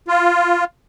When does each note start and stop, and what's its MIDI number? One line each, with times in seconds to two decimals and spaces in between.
0.08 0.64 65